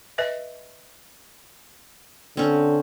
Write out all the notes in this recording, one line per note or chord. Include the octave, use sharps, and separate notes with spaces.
B4 D#5 E5
D3 C4 C#4